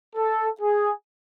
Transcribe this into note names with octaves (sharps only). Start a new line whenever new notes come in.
A4
G#4